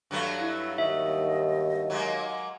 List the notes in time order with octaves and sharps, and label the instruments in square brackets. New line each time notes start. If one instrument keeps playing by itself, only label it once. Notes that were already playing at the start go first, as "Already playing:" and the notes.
[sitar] G2 F#3 A3
[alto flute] E4
[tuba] D#2 [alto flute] D#5 [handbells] E5
[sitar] F#3 G#3 A#3